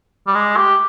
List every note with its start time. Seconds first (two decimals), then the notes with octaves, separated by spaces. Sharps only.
0.27 G3
0.35 G#3
0.57 G4